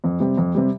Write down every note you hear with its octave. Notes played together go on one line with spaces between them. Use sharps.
F2
C3 G3
F2
C3 G3